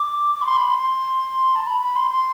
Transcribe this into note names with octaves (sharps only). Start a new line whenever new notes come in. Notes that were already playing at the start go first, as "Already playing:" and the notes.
Already playing: D6
D6
B5
C6
B5
C6
C6
A5
B5
B5
C6
C6